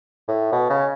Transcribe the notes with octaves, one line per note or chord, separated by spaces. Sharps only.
A2
B2
C#3